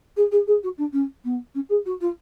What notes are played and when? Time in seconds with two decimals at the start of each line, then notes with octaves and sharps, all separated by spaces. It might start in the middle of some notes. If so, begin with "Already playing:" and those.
0.16 G#4
0.31 G#4
0.47 G#4
0.63 F#4
0.78 D4
0.93 C#4
1.24 B3
1.55 C#4
1.69 G#4
1.85 F#4
2.01 F4